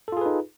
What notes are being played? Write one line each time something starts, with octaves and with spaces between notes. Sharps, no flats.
D#4 F4 G#4 A4 B4